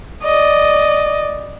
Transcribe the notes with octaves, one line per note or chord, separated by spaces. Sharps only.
D5 D#5